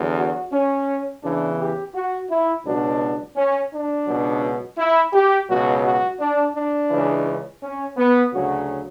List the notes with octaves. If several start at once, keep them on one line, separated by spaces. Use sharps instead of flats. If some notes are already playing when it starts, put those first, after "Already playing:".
Already playing: E2 D3 F#3
F#4
C#4
E2 C#3 E3 D4
G4
F#4
E4
C#2 B2 F#3 D4
C#4
D4
C#2 B2 F#3
E4
G4
C#2 B2 F#3 F#4
F#4
D4
D4
C#2 C#3 E3
C#4
B3
D2 C#3 F#3 F#4